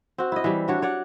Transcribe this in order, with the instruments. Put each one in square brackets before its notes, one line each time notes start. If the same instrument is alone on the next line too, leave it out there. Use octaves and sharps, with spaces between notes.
[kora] C4 F#4
E4 D#5
E3 G3
D4 F#4 C#5
C#5 D5 F#5